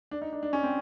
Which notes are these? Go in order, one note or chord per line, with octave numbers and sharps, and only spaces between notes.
D4
D#4
D4
D4
C#4
C4